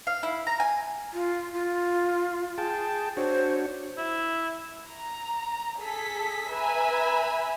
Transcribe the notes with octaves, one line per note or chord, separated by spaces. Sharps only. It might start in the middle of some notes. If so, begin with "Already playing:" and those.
F5
E4
A#5
G#5
F4
F4
G#4 G5 A5
D4 F#4 C5 C#5
E4
A#5
G#4 A4 B6
B4 E5 G#5 A#5 B5